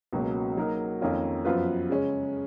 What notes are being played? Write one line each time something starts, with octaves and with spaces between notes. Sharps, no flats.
C#2 B2 F#3 A#3 C#4
F#3 A#3 D#4 F#4 A#4
F2 D#3 A#3 C#4 F4
F#2 F3 B3 F4 B4
C#3 G#3 C#4